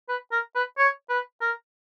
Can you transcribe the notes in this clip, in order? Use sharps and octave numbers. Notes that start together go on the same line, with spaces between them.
B4
A#4
B4
C#5
B4
A#4